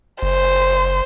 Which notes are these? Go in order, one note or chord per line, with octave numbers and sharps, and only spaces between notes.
F#1 C5